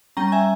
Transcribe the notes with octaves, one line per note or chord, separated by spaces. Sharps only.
G3 C#4 G5 A#5
A#5
E5 G#5